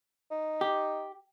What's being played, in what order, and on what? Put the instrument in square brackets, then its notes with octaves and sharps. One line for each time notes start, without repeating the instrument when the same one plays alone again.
[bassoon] D#4
[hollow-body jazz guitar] G4